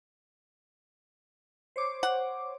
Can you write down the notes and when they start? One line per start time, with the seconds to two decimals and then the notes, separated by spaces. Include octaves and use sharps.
1.76 C5 C#5 D6
2.03 F#5